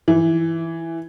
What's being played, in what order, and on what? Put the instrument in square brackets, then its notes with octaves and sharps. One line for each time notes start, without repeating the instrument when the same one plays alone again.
[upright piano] E3